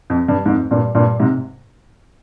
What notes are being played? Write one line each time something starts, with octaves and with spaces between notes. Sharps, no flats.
F2
G2
F2 G#2
G2 A#2
G2 A#2
G#2 C3